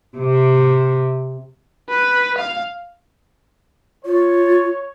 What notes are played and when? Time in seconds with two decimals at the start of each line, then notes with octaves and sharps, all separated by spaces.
0.16 C3
1.89 B4
2.38 F5
4.05 F4 C#5